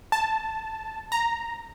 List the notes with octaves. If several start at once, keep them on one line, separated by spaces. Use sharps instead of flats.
A5
A#5